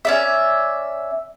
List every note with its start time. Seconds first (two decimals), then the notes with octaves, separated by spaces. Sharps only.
0.05 C#4 D5 E5